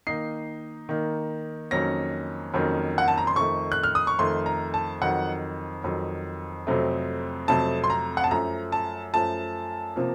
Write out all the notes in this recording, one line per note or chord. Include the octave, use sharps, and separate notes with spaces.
D#3 A#3 D#4 C7
D#3 A#3 D#4
F2 D#3 F#3 A#3 C#4 A#6
F2 D#3 F#3 A#3 C#4
F#5
A5
A#5
C6
F2 D#3 A3 C#6
F#6
F6
D#6
C#6
F2 D#3 A3 C6
A#5
A5
F2 D#3 F#3 F#5
F2 D#3 F#3
F2 C3 F#3 A3 C4
F2 C3 F#3 A3 C4 A5
C6
A#5
F#5
A5
F#2 F3 A3 A#5
A5
F#2 F3 A3 A5
C3 F3 A#3